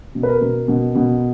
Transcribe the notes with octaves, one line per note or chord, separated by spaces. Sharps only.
B2
B4
A#4
B2
B2
B2